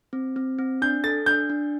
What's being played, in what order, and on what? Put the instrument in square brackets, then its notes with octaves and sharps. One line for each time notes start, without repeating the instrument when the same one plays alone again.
[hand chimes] C4
C4
C4
[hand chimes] D4 [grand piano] G6
[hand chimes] A4 [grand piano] A6
[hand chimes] D4 [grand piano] G6
[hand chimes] D4